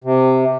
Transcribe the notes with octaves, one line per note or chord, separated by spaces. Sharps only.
C3